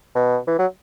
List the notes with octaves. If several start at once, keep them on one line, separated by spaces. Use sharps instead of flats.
B2
E3
F#3